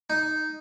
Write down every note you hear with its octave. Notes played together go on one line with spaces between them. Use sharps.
D#4